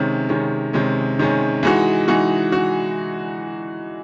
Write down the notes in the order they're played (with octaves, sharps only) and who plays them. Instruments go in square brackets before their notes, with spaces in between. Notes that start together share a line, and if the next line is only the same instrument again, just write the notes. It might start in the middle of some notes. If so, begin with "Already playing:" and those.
Already playing: [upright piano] C3 D#3 G#3 C#4
C3 D#3 G#3 C#4
C3 D#3 G#3 C#4
C3 D#3 G#3 C#4
E3 G#3 D#4 F#4
E3 G#3 D#4 F#4
F#4